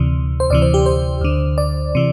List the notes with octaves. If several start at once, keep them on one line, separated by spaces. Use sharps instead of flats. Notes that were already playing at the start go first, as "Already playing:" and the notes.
Already playing: D2 C3 E3
C5
D2 C3 E3 D5
C5
G4
C5
D2 D3
D5
C3 E3